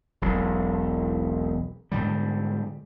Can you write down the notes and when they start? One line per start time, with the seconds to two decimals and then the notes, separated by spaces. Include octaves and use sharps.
0.22 E1 B1
1.92 G#2 D3 G3